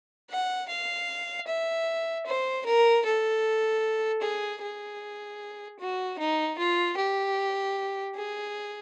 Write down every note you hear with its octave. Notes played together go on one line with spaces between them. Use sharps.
F#5
F5
E5
C5
A#4
A4
G#4
G#4
F#4
D#4
F4
G4
G#4